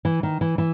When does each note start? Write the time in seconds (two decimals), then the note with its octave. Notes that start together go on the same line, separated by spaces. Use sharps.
0.05 E3
0.23 D#3
0.41 E3
0.58 E3